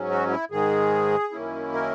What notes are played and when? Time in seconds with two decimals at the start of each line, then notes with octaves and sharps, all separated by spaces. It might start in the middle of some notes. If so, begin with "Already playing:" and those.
Already playing: G#2 F#3 C#4
0.10 F#4
0.31 E4
0.51 G#2 D#3 G#3 G#4
1.32 F#2 D#3 A#3 C#4 E4
1.73 A#4